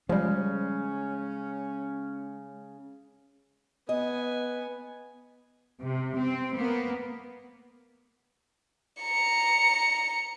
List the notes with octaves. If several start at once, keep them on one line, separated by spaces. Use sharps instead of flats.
C#3 F3 G3 G#3 C#4
B3 D#5 G#5
C3
C4
A#3 B3
A#5 C#7